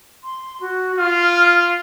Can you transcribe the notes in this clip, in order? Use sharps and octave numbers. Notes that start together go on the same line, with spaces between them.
C6
F#4
F4 F6